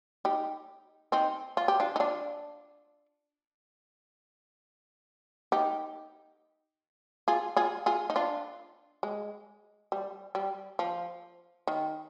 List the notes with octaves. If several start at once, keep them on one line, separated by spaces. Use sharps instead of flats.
D#4 G4
C4 D#4
F4
G4
D4 F4
D#4
D4 F4
D#4 G4
F4 G#4
F4 G#4
F4 G#4
D#4
D4 F4
G#3
G3
G3
F3
D#3